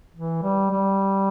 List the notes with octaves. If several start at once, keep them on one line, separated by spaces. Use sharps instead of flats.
E3
G3
G3